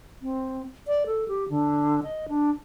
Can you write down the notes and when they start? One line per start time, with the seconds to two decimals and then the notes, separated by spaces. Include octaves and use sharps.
0.22 C4
0.87 D5
1.07 A4
1.28 G4
1.49 D3
2.03 D#5
2.29 D4